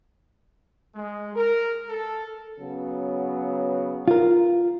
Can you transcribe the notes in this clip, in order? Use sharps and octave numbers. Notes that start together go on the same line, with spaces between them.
G#3
A#4
A4
C#3 F#3 B3
F4 A#4